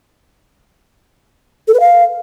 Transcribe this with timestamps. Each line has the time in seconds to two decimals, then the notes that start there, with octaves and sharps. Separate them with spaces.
1.68 A4
1.74 B4
1.80 F5